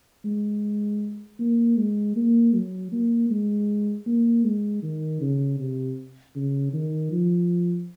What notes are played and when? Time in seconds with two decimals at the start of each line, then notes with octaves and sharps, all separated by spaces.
0.25 G#3
1.39 A#3
1.77 G#3
2.16 A#3
2.54 F#3
2.92 A#3
3.30 G#3
4.06 A#3
4.44 G#3
4.82 D#3
5.21 C#3
5.59 C3
6.36 C#3
6.73 D#3
7.11 F3